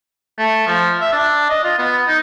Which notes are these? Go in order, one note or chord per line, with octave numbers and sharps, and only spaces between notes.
A3
F3
E5
D4
D#5
F4
B3
D#4